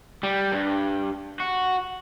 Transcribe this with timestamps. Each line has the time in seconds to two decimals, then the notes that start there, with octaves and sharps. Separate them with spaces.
0.23 G3
0.52 G2
1.40 F#4